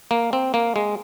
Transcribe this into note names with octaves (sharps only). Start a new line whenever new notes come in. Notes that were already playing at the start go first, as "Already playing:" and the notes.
A#3
C4
A#3
G#3